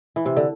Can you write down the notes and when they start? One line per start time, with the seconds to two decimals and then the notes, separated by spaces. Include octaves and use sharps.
0.16 E3
0.26 C3
0.36 D3